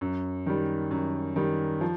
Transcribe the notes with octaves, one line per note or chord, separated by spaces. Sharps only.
F#2
D#3 G3
F#2
D#3 G3
F3